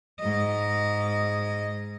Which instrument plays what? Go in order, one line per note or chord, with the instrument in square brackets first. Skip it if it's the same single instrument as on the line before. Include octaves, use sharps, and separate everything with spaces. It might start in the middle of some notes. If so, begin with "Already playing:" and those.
[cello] G#2 D#5